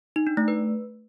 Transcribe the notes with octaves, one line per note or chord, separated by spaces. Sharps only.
D#4
D4
A3
B4